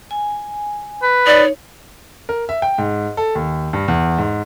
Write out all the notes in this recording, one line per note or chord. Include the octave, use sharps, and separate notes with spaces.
G#5
B4
D#4 C#5 D5
A#4
E5
G5
G#2
A4
D#2
G2
E2
G#2